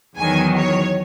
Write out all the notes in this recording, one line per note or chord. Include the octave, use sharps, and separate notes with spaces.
E2 D#3 F#3 G#5
C#5